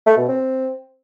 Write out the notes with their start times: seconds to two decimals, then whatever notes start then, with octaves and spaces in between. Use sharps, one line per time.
0.06 A3
0.17 B2
0.28 C4